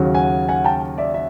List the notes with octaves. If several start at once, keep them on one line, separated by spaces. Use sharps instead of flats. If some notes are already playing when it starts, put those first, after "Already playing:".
Already playing: D#2 C#3 F#3
F#5 G#5
F#5 G#5
G5 A5
D5 E5
E5